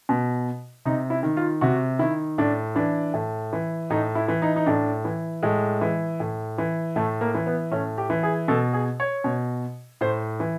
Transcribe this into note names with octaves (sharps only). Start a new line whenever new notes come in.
B2
C3 D#4
E4
D#3
F4
C3 F#4
D#3 E4
A2 D4
E3 D4
A2
E3
A2 D#4
E4
E3
D#4
D#4
A2 D4
E3
A2 G#3
E3
A2
E3
A2 A3
A#3
E3
B3
A2 C#4
G4
E3
G#4
B2 A4
G#4
C#5
B2
A2 C5
E3